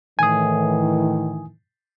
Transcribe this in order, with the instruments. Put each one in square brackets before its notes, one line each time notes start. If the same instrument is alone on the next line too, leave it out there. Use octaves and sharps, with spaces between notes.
[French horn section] A2 D#3 E3 [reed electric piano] G#5 D#6